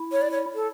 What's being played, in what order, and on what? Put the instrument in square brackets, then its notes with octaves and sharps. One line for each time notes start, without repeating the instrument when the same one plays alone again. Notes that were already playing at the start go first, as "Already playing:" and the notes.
Already playing: [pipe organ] E4
[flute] C#5
D5
C#5
A4